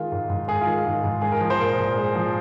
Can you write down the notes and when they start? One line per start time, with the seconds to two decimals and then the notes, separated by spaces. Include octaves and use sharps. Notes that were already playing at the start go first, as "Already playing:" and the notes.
Already playing: D#3 G#3 F4
0.12 G#2
0.30 G#2
0.48 G#3 G#4
0.61 F4
0.67 D#3
0.74 G#4
0.85 G#2
1.04 G#2
1.22 G#3 G#4
1.32 A#4
1.41 F3
1.50 C5
1.59 A#2 A#4
1.78 A#2
1.97 G#3
2.15 F3